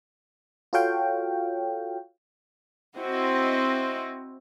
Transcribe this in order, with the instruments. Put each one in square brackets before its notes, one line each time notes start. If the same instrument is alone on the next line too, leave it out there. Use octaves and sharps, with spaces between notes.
[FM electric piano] F4 F#4 A4 C#5 F5 G5
[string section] C4 E4 F#4 D#5